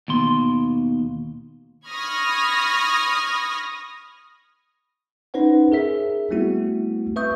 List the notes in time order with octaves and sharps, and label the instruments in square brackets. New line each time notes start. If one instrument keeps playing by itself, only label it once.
[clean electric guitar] D#2 B2 C6
[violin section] B5 C#6 D#6 F6 G#6 A#6
[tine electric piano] C#4 D#4 B4 C5 F#5
G#4 A#4 E5 B6
G3 A3 B3 C4 E4 F#4
B4 E5 C#6 D#6 G6